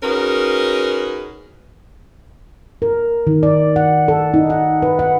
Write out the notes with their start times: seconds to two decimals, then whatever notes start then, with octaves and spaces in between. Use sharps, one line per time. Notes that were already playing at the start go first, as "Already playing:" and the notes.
0.03 C#4 D#4 F#4 G#4 A#4 B4
2.82 A#4
3.27 D#3
3.43 D5
3.76 F#5
4.08 A4
4.34 D#4
4.50 F#5
4.82 B4
4.99 F#5